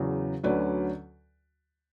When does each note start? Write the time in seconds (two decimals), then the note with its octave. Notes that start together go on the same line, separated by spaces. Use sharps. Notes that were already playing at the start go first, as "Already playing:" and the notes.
Already playing: E2 C#3 F#3
0.43 D2 D3 F#3 C#4 B4 D5